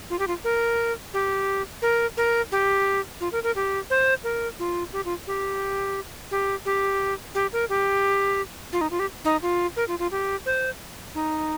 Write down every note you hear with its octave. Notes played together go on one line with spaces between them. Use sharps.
F4
G4
F4
A#4
G4
A#4
A#4
G4
F4
A#4
A#4
G4
C5
A#4
F4
G4
F4
G4
G4
G4
G4
A#4
G4
F4
D#4
F4
G4
D#4
F4
A#4
F4
F4
G4
C5
D#4